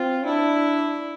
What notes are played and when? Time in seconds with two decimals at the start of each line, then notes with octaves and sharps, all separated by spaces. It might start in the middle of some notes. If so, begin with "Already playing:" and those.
Already playing: C4 F4
0.25 D4 E4